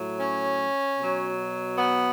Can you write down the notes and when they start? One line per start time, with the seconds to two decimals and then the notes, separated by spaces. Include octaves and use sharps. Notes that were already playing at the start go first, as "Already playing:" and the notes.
Already playing: A2 F#3
0.19 C#4
0.98 B2 F#3
1.77 B3